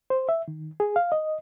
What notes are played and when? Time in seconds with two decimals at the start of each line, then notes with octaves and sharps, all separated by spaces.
0.10 C5
0.29 E5
0.48 D#3
0.80 G#4
0.96 F5
1.12 D#5